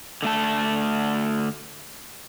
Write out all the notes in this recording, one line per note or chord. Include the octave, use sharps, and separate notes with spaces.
D3 A3 A5